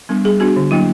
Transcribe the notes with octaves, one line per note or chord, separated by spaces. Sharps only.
G3 B3 D4
G3 G#4
B3 D4 F#4
D3
F#3 A#3 D4 E4